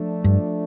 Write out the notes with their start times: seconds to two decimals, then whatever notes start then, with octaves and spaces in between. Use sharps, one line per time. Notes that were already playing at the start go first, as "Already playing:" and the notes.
Already playing: F3 A3 D4
0.24 G2